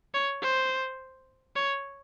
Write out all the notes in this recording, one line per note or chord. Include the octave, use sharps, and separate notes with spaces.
C#5
C5
C#5